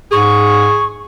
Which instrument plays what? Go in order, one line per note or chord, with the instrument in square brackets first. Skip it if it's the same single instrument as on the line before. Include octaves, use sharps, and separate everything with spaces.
[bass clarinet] G#2 [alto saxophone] G#4 [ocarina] C#6